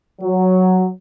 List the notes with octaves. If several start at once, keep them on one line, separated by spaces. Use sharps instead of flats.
F#3